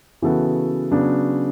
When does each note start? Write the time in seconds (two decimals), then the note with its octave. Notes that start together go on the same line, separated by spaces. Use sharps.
0.22 C#3 E3 B3 F#4 A4
0.91 C#3 F#3 B3 D4